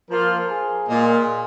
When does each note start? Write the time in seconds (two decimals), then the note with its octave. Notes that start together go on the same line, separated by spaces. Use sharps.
0.11 F3 A#3 F4 A#4
0.50 G#4
0.89 A#2 G#3 F4